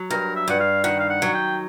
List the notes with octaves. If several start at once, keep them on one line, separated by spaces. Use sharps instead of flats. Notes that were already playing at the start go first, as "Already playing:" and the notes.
Already playing: F#3
G2 A#4
E5
G2 F#5
F5
D#3 F#5
F5
F#5
F#3
G5